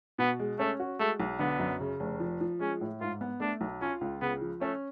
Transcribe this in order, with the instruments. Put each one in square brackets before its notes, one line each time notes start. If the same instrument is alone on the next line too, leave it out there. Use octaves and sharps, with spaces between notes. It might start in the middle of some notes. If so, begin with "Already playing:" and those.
[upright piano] B2 [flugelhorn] B3
[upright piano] G#3
[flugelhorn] A3 [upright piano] C#4
[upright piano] F#4
[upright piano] G#3 [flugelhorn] A3
[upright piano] B1
[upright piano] D3 [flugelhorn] B3
[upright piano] F#2
C#3
F1
F3
F3
[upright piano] G#3 [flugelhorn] C#4
[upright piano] A2
[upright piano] G#2 [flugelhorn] F4
[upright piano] B3
[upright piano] A3 [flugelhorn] D4
[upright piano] B1
[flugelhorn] C#4 [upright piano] F4
[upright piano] C#2
[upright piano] C#3 [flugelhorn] B3
[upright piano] F3
[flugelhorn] A3 [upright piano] C#4